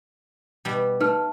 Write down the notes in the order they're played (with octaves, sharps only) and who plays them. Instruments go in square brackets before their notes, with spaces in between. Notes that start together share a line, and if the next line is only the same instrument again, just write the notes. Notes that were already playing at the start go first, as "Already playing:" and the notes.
[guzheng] B2 G3
[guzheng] A3 [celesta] D#4 B4 F6